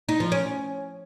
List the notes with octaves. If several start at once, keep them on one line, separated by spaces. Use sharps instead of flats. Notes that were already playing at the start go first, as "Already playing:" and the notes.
D#4
F3
C#4